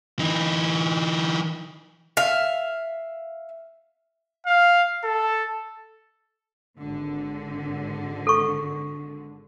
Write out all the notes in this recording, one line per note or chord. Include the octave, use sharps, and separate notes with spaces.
E3 D#4
E5 F5
F5
A4
G#1 D3
A4 C#6